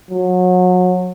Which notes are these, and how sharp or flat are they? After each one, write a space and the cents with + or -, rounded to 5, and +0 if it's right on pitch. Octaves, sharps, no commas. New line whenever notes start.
F#3 -30